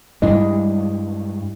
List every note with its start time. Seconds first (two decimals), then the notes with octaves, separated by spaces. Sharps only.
0.22 G2 G3 G#3 D4 E4 D#5